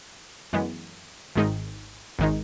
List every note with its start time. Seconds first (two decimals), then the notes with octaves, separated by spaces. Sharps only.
0.53 F#2 E3 G#3 B3
1.35 G#1 G#2 D#3 G#3 D#4
2.19 G#1 D#3 G#3 D#4